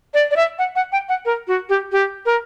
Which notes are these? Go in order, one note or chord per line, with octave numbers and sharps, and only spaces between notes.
D5
D5
E5
F#5
F#5
G5
F#5
A#4
F#4
G4
G4
A#4